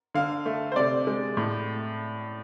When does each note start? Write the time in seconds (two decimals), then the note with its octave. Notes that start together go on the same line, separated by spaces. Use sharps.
0.14 D3 F5
0.46 A3
0.72 C5
0.76 C3 D5
1.07 G#3
1.37 A2